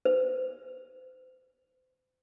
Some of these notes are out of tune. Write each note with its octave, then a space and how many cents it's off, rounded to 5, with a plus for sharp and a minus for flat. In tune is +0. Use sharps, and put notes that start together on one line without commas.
C5 -35